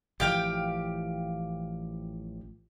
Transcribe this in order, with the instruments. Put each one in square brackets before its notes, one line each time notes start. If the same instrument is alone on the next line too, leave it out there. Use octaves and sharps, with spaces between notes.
[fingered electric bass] A1 E3 F3 [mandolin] G4 F5 G5